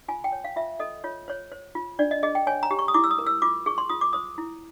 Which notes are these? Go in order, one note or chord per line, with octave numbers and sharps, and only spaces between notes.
F4 G#5
G5
C#5
F5
F4 E5
A4 D#5
F4 C#5
C5 C#5
C5
F4
D4 D5
D#5
G#4 D#5
G5
C#5 G#5
A#5
G4
C#6
D#6
E4 D6
E6
D#6
A#4
E6
F4 D6
G#4 C#6
C6
F4 D#6
D6
C5 D#6
E4